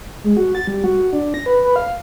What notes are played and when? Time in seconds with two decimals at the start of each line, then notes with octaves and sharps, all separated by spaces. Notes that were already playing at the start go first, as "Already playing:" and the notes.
0.24 G#3
0.37 F#4
0.55 A6
0.67 G3
0.84 F#4
0.98 F#4
1.13 D4
1.34 A#6
1.46 B4
1.64 B4
1.76 F5